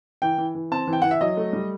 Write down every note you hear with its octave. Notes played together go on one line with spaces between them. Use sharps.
E3 G5
E3
E3
C4 A5
E3
G5
E3 F#5
E5
F#3 D#5
A3
G3